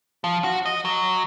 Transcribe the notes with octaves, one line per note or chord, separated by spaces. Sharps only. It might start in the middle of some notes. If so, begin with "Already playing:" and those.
F3
F#4
D#5
F#3